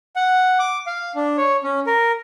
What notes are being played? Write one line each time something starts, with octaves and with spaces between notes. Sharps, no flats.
F#5
D6
F5
D4
C#5
C#4
A#4